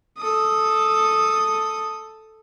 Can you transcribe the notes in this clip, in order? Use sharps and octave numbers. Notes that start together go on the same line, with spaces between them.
A4 D#6